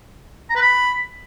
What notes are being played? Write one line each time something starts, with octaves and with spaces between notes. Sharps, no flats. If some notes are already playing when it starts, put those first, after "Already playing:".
A#5
B4
B5